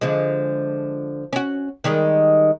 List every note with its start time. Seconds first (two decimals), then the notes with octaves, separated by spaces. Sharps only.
0.01 D3 F3 G#3
1.33 C#4 F#4
1.84 D#3 G3 G#3